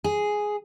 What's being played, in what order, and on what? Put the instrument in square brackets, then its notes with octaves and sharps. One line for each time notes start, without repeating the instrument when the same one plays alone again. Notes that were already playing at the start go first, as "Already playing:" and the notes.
[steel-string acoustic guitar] G#4